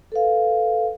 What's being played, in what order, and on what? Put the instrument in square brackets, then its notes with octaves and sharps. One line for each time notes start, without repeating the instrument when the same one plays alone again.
[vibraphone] A4 B4 F5